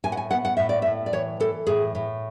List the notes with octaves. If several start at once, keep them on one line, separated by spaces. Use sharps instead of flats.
A2 G#5
F#5
G#5
B3 F#5
F#5
A2 E5
D5
A2 E5
D5
E3 C#5
E3 A4
A2 G#4
A2